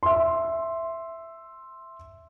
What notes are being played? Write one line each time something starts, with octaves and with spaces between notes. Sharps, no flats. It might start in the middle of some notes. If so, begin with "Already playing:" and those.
E5 C6